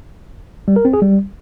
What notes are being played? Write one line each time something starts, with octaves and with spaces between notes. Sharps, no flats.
G3
A#4
C4
G#4
G3